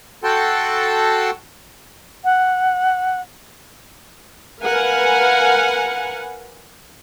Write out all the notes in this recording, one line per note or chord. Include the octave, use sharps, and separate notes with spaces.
F#4 A4 F#5 G5 A5 C6
F#5
A#4 B4 F5 F#5 G#5